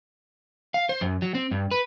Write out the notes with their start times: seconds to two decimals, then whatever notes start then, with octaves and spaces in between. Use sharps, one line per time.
0.74 F5
0.89 C5
1.01 F#2
1.22 F#3
1.35 C4
1.51 G2
1.71 B4